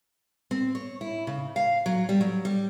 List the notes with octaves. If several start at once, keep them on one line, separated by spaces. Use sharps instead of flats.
C4
C#5
E4
C#3
F5
F#3
G3
F#3
G3